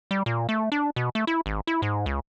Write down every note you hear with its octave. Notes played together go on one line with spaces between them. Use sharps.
G3
A#2
A3
D4
B2
A3
E4
G#1
E4
G#2
C#2